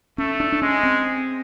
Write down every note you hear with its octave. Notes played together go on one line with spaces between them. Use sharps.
A3 C#4
D4
D4
G#3 C#4
C4